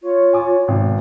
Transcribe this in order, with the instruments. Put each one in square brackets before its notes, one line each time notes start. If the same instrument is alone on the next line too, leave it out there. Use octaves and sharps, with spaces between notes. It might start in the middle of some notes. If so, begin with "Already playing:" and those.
[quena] F4 [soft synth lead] C#5
[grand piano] G#5 D6
G#1 B2